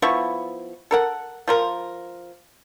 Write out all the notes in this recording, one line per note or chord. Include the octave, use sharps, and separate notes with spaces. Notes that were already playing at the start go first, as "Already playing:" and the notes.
F3 B3 E4 C#6
A4 A#4 F#5
F3 F4 A#4